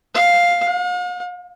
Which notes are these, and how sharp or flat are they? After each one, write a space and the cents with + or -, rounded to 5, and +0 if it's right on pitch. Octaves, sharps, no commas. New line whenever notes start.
F5 +5
F5 +45